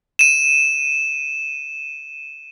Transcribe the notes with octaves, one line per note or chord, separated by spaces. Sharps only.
D#7 E7